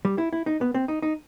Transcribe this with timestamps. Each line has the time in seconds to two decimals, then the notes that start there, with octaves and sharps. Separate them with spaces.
0.05 G3
0.18 E4
0.33 E4
0.46 D#4
0.61 B3
0.74 C4
0.88 D#4
1.02 D#4